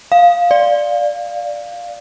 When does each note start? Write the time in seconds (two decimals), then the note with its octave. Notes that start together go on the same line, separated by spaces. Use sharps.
0.12 F5
0.51 D5